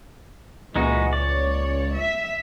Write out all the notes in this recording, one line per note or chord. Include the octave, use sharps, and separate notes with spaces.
C#2 A#2 E3 G#3 D#4 F#4
C#5 D5
E5